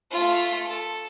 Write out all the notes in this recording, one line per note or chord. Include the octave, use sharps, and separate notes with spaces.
A3 F4
A4